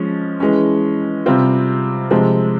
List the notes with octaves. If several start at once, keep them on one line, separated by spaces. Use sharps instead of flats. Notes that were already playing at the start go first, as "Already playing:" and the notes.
Already playing: F3 G#3 C#4
E3 G#3 C#4
C3 G3 C4 F4
C3 F3 G#3 C4